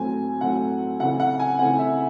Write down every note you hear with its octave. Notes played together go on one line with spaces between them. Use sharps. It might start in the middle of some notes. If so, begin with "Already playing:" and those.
Already playing: A2 F#3 A3 C4 G#5
A2 F#3 A3 C4 F#5
C#3 E3 A3 C4 F#5
F#5
G#5
C#3 E3 A3 C4 F#5
E5